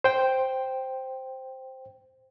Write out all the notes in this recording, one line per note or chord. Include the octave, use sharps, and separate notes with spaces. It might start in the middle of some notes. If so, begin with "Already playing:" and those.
C5 G5